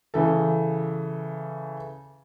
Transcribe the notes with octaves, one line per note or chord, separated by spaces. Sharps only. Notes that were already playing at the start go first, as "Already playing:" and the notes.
C#3 E3 A4